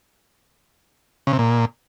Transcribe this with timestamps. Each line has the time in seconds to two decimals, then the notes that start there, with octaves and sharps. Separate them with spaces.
1.27 C#3
1.33 C3
1.39 A#2